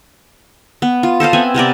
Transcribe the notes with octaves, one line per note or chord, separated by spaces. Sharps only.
B3
F4
A4 C5 D#5 F5
B3 C4 E5 G#5
C3 B3 A#4 D5